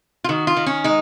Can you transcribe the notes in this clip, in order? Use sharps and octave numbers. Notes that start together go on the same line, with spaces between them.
F4
D#3 F#4
F4
D#3
C#4
G#3 D#4